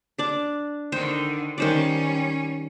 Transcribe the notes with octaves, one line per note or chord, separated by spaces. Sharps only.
D4 D5
D3 D#3 C5 G5 C6
D#3 G3 C#4 C5 D5